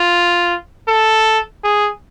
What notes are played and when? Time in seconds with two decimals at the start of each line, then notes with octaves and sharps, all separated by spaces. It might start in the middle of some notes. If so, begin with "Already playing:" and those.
Already playing: F4
0.88 A4
1.64 G#4